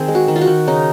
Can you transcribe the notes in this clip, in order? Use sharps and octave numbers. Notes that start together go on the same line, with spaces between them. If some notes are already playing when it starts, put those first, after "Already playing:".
Already playing: D#3 C4 G#4
G#3
F#4
D#3
F4
F#4
D#3
C#3 D#4